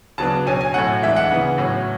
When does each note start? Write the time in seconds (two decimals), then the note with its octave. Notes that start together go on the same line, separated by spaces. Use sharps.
0.18 C#3 F#3 B3 D4 A5
0.46 B2 F#3 C#4 G#5
0.61 G#5
0.74 A2 F#3 A3 F#5
1.02 E3 G#3 D4 E5
1.16 F#5
1.31 C#3 E3 B3
1.58 A2 F#3 C#4